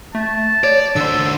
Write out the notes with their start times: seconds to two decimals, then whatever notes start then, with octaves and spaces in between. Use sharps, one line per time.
0.15 A3 A5
0.64 C#5 D5
0.96 D3 C5 E6